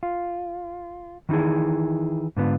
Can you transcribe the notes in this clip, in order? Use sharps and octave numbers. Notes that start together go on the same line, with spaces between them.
F4
D#3 E3 D#4 E4 G#4
G#2 D3 B3 F4